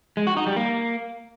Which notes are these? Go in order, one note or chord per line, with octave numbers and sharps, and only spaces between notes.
G#3
F#4
D#4
G3
A#3